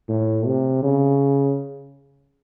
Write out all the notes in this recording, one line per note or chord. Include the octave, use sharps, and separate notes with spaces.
A2
C3
C#3